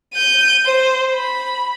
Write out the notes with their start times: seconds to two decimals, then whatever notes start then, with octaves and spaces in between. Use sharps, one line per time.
0.14 G6 D#7
0.66 C5
1.15 B5